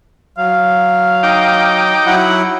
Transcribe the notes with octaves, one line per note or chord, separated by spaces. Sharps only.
F#3 F5
D#4 G5 D6
F#3 E4 F#5